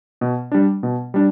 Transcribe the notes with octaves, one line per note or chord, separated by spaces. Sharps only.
B2
G3 D4
B2
G3 D4